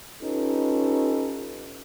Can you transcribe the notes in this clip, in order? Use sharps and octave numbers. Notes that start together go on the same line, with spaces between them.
C#4 D#4 F4 G4 A4 B4